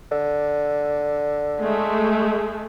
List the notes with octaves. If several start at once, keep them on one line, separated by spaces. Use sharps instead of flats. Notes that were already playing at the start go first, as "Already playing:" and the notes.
D3
G#3 A3